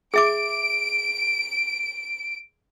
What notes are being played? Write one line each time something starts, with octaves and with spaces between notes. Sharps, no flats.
G#4 E5 D6 D7